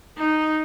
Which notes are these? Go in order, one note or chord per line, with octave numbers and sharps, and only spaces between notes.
D#4